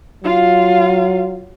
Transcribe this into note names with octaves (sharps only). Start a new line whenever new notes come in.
F#3 F4 F5